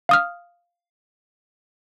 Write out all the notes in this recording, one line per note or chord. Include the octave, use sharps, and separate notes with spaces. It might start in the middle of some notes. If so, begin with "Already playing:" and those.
F5 D#6 F6